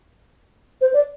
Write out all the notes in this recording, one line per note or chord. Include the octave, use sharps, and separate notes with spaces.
C5
D5